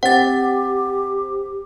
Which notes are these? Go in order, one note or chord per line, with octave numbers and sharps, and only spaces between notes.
C4 G4 F#5 A6